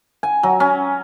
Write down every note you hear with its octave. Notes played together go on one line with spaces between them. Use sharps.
G#5
F#3
C#4